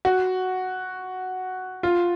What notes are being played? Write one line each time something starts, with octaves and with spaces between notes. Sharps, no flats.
F#4
F4